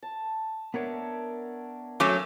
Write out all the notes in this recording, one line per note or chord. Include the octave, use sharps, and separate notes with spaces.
A5
B3 D4 A#4 C#5 E5 A5
F#3 A3 C#4 D6